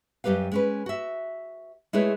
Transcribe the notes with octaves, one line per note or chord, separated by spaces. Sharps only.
F#2 G3 G4 B4 F5
G#3 C#4 B4
F#4 E5
G#3 A3 E4 G#4 B4 C#5